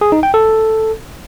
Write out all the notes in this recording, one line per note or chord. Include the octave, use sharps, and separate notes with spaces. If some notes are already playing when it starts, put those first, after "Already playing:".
G#4
D#4
G5
A4